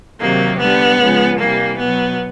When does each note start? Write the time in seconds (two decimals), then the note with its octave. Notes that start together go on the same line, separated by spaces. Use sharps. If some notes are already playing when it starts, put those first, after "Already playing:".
0.20 C3 D#3 F#3 A#3
0.59 D3 G3 B3
0.98 C#3 F3 G#3
1.38 C3 E3 G3 A#3
1.79 B2 F#3 B3